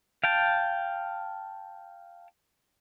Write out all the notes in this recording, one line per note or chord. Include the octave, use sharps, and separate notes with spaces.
F5 G5 A5